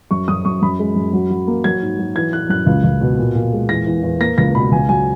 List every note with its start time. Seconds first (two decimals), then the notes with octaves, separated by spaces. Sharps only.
0.11 F#2 C#6
0.28 F#2 D#6
0.45 F#2 C#6
0.62 F#2 B5
0.79 G#3
0.96 F#2
1.13 F#3
1.30 F#3
1.47 A#3
1.64 F#3 G#6
1.82 G#2
1.99 F#3
2.15 E3 G#6
2.33 E3 F#6
2.49 F#2 F#6
2.66 C#2
2.84 C#2
3.01 B2
3.18 A#2
3.35 A#2
3.53 G#3
3.69 E2 A#6
3.87 E2
4.03 E2
4.20 A#3 A#6
4.38 C#2 A#6
4.55 B2 B5
4.71 C#2 G#5
4.89 F#3 G#5